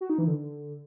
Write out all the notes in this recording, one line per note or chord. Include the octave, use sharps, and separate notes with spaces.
F#4
D#4
E3
D3